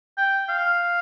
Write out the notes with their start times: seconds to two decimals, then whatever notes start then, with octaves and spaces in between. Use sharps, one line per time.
0.17 G5
0.49 F5